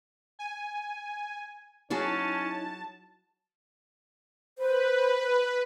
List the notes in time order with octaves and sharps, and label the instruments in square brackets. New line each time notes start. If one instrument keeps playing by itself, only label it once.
[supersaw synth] G#5
[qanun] F#3 F#4 G#4 [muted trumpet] C#4 [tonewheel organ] D#4 E4 [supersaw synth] A5
[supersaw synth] B4 [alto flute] C5